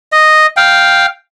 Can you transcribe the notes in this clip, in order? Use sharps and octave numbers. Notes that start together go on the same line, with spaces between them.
D#5
F5 G5